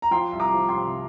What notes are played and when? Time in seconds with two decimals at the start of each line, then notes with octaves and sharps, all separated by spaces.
0.02 A#5
0.11 F3 G5 C6
0.32 C2
0.40 A#5 D6
0.53 F3
0.69 G5 C6
0.76 C3